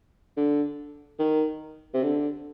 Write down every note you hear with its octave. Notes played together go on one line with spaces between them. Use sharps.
D3
D#3
C3
D3